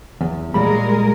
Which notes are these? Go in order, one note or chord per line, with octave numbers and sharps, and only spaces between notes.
E2
A#2 G3 G#3 A#4 B5